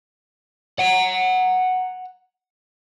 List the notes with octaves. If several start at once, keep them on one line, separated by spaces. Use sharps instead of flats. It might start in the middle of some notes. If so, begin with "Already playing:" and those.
F#5 A#5